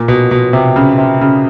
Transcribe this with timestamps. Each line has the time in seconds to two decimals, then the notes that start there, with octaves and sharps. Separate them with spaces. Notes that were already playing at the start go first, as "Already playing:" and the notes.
Already playing: A#2
0.08 B2
0.31 B2
0.53 C3
0.76 C#3
0.98 C3
1.21 C#3